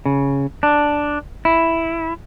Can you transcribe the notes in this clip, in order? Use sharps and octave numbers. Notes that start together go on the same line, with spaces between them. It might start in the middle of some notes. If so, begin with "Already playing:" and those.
C#3
D4
E4